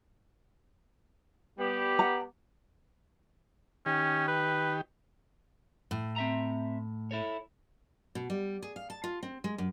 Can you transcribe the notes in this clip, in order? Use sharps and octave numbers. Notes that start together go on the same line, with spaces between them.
G3 B3 G4
F#5 A#5
D#3 C#4 G4
B4
A2
C4 E5 A#5
E4 A4 C#5
B2
G3
G#4
F5
A5
F4
C4
G#3
F#2